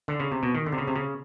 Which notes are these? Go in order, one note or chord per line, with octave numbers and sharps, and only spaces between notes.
D3
C#3
C3
B2
D#3
D3
C3
C#3
C3
C#3